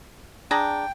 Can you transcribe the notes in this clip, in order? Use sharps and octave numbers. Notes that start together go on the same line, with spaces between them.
D4 G#4 G5 A#5